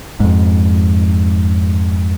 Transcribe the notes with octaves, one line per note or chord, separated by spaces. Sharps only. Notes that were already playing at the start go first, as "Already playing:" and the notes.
F2 G#2